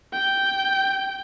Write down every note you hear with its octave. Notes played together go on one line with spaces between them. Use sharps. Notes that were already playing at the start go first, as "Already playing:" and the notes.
G5